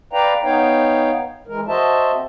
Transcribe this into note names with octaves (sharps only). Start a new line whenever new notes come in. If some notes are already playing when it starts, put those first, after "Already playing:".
B4 D5 F5 G5 A#5
B3 D#4 C#5 F5 G5
E3 G#3 A#4
F#4 C5 D#5 E5 A5
C4